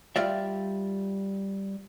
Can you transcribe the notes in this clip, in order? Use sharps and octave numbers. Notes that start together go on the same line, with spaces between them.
G3 F4 D5 E5